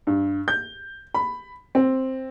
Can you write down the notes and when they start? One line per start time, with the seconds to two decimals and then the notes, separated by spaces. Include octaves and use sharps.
0.07 G2
0.48 G6
1.14 B5
1.75 C4